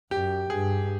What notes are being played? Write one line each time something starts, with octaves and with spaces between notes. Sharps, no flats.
F#2 G4
G2 G#4